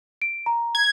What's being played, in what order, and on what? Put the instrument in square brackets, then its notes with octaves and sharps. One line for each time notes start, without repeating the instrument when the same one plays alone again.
[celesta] D7
A#5
[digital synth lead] G#6